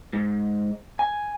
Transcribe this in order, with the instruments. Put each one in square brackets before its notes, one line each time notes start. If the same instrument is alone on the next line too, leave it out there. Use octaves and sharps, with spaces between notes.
[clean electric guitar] G#2
G#5